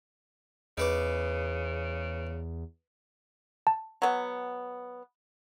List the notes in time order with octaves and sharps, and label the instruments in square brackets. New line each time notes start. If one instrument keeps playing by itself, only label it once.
[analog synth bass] E2 [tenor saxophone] C#3 [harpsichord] D#4 B4 D6
[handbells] A5
[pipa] F#3 B3